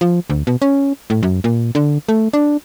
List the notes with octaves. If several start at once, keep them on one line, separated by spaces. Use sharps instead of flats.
F3
D2
B2
C#4
A2
F#2
A#2
D3
A3
D4